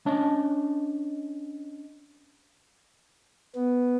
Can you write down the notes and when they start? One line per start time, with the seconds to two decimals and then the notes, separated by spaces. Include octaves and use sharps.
0.06 C#4 D4 C#5 D#5 A5
3.55 B3